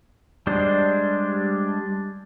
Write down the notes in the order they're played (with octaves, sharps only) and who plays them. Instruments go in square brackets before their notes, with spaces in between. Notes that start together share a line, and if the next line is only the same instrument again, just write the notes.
[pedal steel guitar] G3 G#3 D4 C5